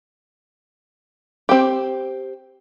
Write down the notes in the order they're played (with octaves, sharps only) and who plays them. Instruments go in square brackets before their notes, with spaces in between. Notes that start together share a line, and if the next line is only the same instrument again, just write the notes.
[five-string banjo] C4 G4